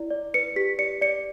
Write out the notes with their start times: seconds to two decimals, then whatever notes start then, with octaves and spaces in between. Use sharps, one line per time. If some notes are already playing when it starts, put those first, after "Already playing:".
Already playing: E4 D5
0.10 D5
0.34 B4 C#7
0.56 G4 B6
0.79 D5 C#7
1.01 D5 C#7